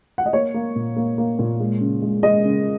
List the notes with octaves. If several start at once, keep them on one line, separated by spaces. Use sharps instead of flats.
F#5
D#5
A#3 C#5
A#3
A#2
A#3
A#3
A#2
G#3
C#3
G#3
G#3 D#5
C#3